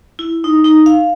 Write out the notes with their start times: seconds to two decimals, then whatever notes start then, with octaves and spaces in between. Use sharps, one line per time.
0.19 E4
0.44 D#4
0.64 D#4
0.86 F5